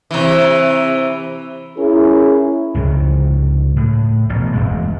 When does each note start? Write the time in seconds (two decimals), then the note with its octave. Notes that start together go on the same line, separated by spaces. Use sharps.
0.11 C3 E3
1.78 C#4 E4 G#4 A#4
2.75 C#2 G#2 C3 F#3
3.76 A2
4.29 A1 B2
4.53 E1 E2 G#3